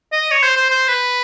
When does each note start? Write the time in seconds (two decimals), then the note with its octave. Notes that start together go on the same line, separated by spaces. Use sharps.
0.12 D#5
0.31 C#5
0.43 C5
0.56 C5
0.69 C5
0.88 B4